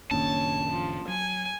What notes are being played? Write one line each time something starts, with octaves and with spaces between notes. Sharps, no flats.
F#1 A#2 D#3 A#3 C#4 D4 C#5 A5
F3
F#3 G#5